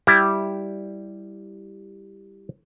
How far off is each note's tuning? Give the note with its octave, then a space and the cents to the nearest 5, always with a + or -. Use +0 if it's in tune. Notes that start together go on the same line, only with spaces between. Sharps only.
G3 +0 E4 +0 G4 +0